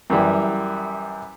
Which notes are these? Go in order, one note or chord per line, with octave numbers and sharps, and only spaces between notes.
F#2 E3 G3 E4